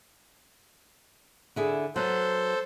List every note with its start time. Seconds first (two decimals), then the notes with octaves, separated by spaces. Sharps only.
1.56 D3 E4 G#4
1.96 F#3 B3 A4 C5